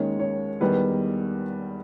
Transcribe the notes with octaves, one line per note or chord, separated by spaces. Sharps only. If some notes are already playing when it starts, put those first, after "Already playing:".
Already playing: D#2 D#3 G#3 C#4 C#5
C#5
E2 D#3 G3 B3 B4